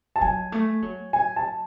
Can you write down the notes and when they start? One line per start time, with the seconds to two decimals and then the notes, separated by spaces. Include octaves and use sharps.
0.16 A5
0.21 F#3 G#5
0.52 A3
0.82 F#3
1.13 G#5
1.36 A5